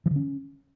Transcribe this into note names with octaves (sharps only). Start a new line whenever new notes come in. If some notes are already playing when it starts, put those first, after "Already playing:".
E3
D3
C#4